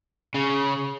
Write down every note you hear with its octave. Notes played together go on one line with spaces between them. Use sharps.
C#3